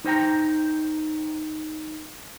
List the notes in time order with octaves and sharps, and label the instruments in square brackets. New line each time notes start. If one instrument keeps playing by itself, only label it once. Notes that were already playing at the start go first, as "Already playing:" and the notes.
[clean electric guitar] D#4 C5 G5 A#5